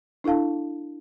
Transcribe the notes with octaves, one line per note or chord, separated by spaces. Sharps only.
D4 E4 A4 F5 A5